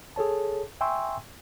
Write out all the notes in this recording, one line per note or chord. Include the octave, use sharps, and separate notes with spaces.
G#4 A4 C#5 A5
E5 G5 G#5 C6 C#6 E6